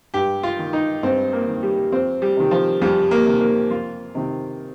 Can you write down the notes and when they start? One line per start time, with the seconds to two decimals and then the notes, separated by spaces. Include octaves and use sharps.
0.14 G2 G4
0.43 F4
0.59 D#3
0.73 D#4
1.03 G2 C4
1.33 A#3
1.48 D#3
1.63 G3
1.92 F2 C4
2.22 G3
2.37 C3 D#3
2.51 F3
2.81 F2 G3
3.11 A#3
3.26 C3 D#3
3.41 A#3
3.71 F2 F4
4.15 C3 D#3